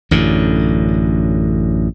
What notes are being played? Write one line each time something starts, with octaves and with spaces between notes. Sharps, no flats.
A1 F#2 D3